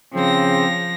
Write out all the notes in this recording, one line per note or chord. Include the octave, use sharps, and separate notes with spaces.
C#3 F3 C4 A#6